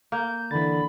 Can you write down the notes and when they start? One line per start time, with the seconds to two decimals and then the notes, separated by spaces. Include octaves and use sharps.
0.12 A#3 G6
0.51 D3 E3 B5 A6